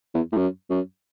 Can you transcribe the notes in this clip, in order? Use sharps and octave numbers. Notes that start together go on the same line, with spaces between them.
E2
A2
F#2
F#2